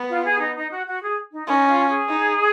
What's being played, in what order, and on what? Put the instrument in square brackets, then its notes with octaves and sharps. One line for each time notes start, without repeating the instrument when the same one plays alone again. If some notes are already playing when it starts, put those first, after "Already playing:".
Already playing: [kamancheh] B3
[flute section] F4
G#4
D#4
D#4
F#4
F#4
G#4
D#4
[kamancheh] C#4 [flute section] D#4
[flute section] F4
G#4
[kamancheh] D#4